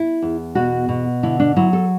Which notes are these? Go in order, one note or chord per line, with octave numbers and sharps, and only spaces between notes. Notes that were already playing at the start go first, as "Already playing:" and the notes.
Already playing: E4
E2
B2 F#4
B2
D3 E4
D4
F#3 E4
A4